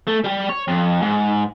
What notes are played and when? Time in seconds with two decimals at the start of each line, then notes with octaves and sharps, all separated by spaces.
0.08 A3
0.25 G3 G4
0.50 C#5
0.68 F2
1.02 G#2